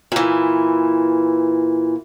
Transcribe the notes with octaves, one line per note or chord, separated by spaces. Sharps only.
A#2 E3